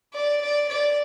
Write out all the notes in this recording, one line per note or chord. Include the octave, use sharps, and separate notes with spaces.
D5
D5
D5